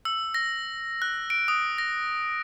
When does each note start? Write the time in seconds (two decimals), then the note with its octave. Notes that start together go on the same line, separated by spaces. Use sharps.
0.05 E6
0.34 A#6
1.02 F#6
1.30 D7
1.48 D#6
1.78 A#6